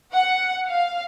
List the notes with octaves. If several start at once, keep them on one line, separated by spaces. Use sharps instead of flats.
F#5
F5